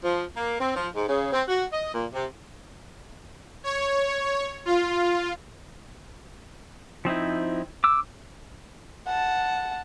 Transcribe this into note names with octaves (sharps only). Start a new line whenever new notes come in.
F3
A#3
C4
F3
G#2
C#3
C4
F#4
D#5
A#2
C3
C#5
F4
F3 C4 D#4 E4
D6 E6
F#5 A5